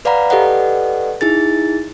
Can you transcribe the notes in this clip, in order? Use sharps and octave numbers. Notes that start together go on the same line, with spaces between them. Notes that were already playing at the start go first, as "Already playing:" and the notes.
B4 D5 F5 F#5 A#5 B5
G4 A4 B4 D5 D#5 F#5
D#4 E4 G#4 A6